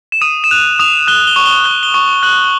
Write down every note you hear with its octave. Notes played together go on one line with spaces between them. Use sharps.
E7
D#6 D#7
E7
F#6 F7
D#6 F7
F#6 G7
G7
C#6
G7
F#6 G7
G7
C#6
F#6 F#7